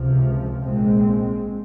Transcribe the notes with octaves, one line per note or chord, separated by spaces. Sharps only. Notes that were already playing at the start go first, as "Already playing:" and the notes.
Already playing: C#2 C3 F3
A#1 A#2 G#3 C4